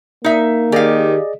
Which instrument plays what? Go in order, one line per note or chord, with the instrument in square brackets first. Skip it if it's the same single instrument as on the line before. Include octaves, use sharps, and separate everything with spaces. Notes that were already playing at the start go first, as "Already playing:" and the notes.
[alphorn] A#3 [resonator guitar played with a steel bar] D#4 E5
[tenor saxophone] D#3 [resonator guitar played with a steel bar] G4 F5 [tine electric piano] G#4 D5 D#5